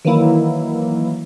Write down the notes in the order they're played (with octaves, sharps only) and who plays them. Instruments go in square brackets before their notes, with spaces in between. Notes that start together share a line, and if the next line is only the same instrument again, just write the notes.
[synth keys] D#3 E3 F#3 A#3 E4